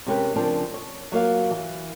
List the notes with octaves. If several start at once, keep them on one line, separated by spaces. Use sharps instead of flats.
C3 G#3 C#4 G4 A#4 B4
C#3 F3 C4 D4 A#4
C#5
F#3 A#3 F4 F5
E3